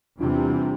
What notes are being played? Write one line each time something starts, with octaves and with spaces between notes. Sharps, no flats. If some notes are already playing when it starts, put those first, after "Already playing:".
E2 C3 E3 G3 D4 F4